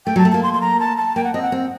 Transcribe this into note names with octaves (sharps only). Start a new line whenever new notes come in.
A3 G5
F#3 A5
A3
A#3 A5
C6
C6
A#5
A5
A5
A#3 G5
F#5
C4 D#5
F#5
C4